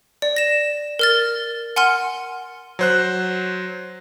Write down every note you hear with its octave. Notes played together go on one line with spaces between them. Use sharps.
D5
A#6 E7
A#4 F6 A6
F#5 G#5 C6 F6 C#7
F#3 C5 F#6